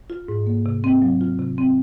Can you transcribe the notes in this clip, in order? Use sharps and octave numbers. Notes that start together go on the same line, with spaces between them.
F4
G#2
A#3
C3
C4
F#3
F4
C3
C4